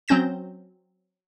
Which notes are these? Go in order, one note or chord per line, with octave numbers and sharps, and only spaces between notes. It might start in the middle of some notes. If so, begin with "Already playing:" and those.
F#3 C4 C#4 G6 A#6 E7